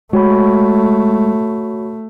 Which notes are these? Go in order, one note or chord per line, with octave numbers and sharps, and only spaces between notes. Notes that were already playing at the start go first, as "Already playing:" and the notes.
G#3 A3 F#4 C#5 B5